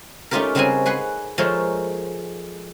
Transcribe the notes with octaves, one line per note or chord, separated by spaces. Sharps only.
A3 C#4 D#4 F4 G4 A#4
C#3 G3 G#3 C4 F#4 G#5
G#4 B4 F#5 G#5 C6
F3 G#3 A3 F4 A#4 C#5